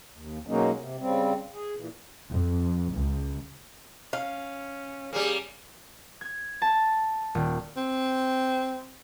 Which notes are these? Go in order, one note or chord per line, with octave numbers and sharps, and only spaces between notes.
D#2
B2 F#3 G#3 A#3 C#4 D#4
C3
C#3 G3 C4
G#4
A#2 E3
F2
C#2
C#4 F5
G3 A#3 C#4 G#4
G#6
A5
D#1
C4